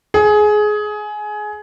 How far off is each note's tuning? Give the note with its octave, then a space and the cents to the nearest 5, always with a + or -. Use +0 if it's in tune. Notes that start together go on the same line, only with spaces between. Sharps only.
G#4 +20